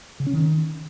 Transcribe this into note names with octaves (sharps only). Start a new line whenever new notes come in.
C#3
C#4
D#3